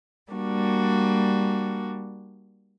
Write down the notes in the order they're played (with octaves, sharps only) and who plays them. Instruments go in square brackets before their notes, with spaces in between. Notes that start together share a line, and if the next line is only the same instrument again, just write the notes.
[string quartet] G3 A#3 D4 F#4